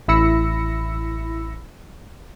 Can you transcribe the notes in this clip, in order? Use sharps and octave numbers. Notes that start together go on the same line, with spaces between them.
A1 E4 B5 E6 A#6 C#7